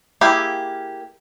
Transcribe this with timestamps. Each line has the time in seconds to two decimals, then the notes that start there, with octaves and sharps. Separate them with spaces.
0.21 A#3 E4 G4 G#4